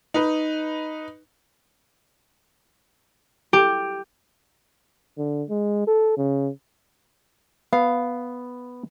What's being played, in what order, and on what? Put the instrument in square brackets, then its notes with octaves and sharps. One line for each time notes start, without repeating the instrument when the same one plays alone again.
[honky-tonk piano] D#4 B4
[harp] G4
[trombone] D3
G#3
A4
C#3
[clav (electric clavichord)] B3 [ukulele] F5